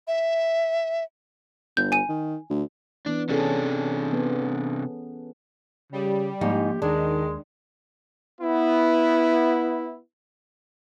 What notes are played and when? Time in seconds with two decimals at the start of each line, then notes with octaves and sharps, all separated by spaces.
0.07 E5
1.77 G1 G6
1.92 G#5 D#7
2.09 D#3
2.50 D2
3.06 E3 B3 D4
3.29 C3 C#4 D4 G#4 A4
4.13 B3
5.92 C#3 G3
6.41 G#2 F3 A#3 D#4 G4
6.82 D#2 D#3 G#3 D4
8.42 B3 E4